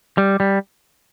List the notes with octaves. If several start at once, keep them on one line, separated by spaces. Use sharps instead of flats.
G3
G3